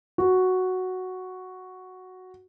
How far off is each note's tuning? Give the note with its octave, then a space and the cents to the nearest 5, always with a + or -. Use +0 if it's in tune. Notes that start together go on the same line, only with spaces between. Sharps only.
F#4 +0